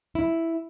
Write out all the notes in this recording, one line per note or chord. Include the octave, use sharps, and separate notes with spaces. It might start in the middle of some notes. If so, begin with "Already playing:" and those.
E4